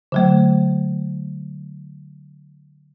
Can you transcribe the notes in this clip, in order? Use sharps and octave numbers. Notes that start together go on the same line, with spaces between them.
D3 F#3 A3